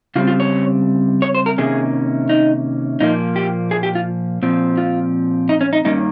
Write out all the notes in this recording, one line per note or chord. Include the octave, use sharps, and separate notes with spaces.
C#3 G3 C4 F4
F4
C#5
C#5
C5
A#4
C3 D#3 A#3 C#4 G#4
D#4
A#2 F3 A#3 D#4
G4
G#4
G4
F4
A#2 F3 C4
F4
D#4
C#4
D#4
G2 D#3 A#3 C#4 D#4